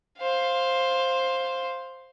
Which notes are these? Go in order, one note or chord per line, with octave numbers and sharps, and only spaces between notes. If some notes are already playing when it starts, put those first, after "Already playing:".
C5 F5